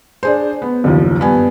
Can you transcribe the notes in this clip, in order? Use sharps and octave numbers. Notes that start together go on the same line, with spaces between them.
D4 G#4 C5
B3
F#1 D#2 F3
G2 B3 G#5